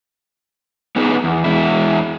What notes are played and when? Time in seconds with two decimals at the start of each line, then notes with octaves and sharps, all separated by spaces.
0.96 B3 D#4 G#4 B4
1.24 E2
1.44 E2 G#3 E4